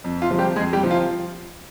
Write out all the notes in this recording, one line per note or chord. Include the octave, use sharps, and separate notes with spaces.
F2
F4
C3 F3
G3 G4
F2 G#3 G#4
G3 G4
C3 F3
F4